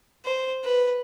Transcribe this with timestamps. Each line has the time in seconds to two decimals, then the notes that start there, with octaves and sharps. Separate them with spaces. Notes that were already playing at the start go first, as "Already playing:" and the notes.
0.25 C5
0.64 B4